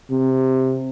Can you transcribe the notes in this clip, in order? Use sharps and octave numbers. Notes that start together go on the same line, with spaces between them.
C3